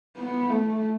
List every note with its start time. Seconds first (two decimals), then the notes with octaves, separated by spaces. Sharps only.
0.17 B3
0.50 A3